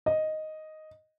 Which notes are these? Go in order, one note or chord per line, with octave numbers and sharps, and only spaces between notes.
D#5